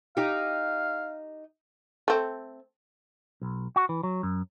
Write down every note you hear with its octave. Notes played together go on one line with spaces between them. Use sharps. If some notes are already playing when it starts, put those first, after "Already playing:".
D#4 G4 F5
A3 C4
B1
F#4
E3
F#3
F#2